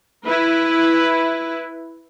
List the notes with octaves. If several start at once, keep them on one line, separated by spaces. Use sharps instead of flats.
E4 B4